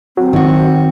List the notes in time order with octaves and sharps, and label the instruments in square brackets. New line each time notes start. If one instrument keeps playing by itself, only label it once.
[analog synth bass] F#3 [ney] C4
[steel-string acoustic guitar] D#3 F#4